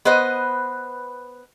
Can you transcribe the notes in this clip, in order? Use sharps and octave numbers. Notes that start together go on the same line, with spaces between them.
B3 B4 C5 D#5